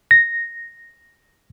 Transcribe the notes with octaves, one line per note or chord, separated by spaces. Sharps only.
A#6